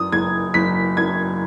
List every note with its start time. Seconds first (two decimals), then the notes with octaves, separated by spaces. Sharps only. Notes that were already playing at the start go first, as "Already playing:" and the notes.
Already playing: F#2 D#6
0.12 F#1 G#6
0.54 F#1 B6
0.97 F#2 G#6